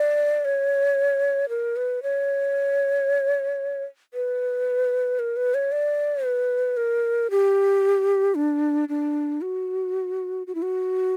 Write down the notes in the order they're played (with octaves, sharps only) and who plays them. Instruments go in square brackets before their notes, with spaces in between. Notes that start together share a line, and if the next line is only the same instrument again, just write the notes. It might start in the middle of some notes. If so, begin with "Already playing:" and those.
Already playing: [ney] D5
C#5
A#4
B4
C#5
B4
A#4
B4
C#5
D5
B4
A#4
G4
D4
D4
F#4
F#4
E4
F#4